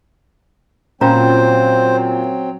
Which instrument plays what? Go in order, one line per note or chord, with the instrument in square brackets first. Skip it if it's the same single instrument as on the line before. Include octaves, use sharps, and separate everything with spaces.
[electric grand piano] A#2 [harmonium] F#3 C4 [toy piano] C#4 F4 A#5 [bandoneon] C5